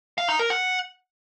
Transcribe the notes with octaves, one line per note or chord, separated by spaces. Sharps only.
F5
D#4
A#4
F#5